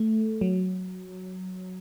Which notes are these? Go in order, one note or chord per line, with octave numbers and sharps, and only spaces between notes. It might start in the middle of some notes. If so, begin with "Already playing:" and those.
Already playing: A3
F#3